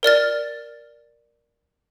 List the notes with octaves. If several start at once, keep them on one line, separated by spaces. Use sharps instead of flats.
A#4 D5 F6 A6